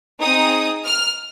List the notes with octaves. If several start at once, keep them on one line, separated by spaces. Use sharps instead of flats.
C4 D#4 G#4 D#6
F6